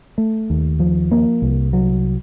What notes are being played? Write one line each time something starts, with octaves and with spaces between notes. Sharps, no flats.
A3
D#2
F3
A#3
C2
F#3